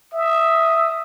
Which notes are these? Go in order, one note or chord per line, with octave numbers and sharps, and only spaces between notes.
E5 D#6